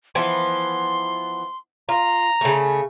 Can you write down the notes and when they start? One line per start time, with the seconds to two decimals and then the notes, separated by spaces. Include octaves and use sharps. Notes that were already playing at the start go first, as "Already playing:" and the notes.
0.15 E3 F3 B3 C6
1.89 F4 A#5
2.41 C#3 A3